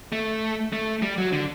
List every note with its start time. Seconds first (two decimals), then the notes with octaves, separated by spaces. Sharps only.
0.12 A3
0.73 A3
1.02 G3
1.18 F#3
1.32 D3